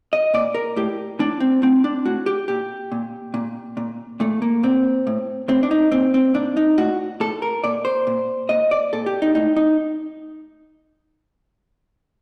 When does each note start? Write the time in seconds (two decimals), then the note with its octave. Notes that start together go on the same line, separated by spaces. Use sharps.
0.13 D#5
0.34 A#2 D5
0.55 A#4
0.76 A2 G4
1.19 A2 D4
1.40 C4
1.62 A2 C4
1.84 D4
2.05 A2 F#4
2.26 G4
2.48 A#2 G4
2.92 A#2
3.34 A#2
3.77 A#2
4.20 A#2 A3
4.42 A#3
4.63 A#2 C4
5.07 A2
5.48 A2 C4
5.63 D4
5.71 D#4
5.92 A#2 C4
6.14 C4
6.34 A#2 D4
6.57 D#4
6.78 A2 F#4
7.20 A2 A4
7.42 A#4
7.64 A#2 D5
7.85 C5
8.07 A#2
8.49 A#2 D#5
8.71 D5
8.93 A#2 A4
9.06 G4
9.22 D#4
9.35 A2 D#4
9.57 D#4